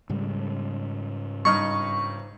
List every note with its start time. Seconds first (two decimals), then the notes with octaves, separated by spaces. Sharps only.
0.09 G#2 C#3 G3
1.45 G2 D#4 C#6 F6